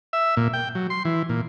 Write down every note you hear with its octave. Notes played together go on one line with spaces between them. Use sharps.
E5
A#2
G5
F#3
C6
E3
A#2